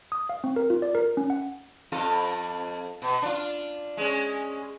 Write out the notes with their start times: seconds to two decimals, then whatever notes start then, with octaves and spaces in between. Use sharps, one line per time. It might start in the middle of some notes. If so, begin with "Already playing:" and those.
0.12 D#6
0.29 F5
0.44 C4
0.56 A#4
0.70 F4
0.82 D5
0.95 A#4
1.17 C#4
1.30 F#5
1.92 F2 F4 A4
3.02 B2
3.22 D4 F4
3.97 G#3 C#4